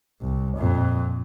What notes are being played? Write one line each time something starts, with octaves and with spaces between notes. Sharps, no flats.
C2
F2 A#2